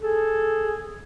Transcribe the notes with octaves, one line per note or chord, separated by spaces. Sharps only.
G#4 A4